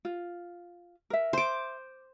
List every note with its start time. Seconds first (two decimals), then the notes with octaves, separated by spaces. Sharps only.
0.05 F4
1.10 A#4 E5
1.33 C5 D6